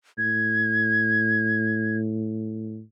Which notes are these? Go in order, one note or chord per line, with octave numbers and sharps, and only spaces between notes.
A2 G#6